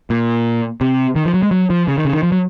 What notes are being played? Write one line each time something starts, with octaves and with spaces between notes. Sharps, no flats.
A#2
C3
D#3
F3
F#3
G#3
F#3
F3
C#3
D#3
C#3
D#3
F3
F#3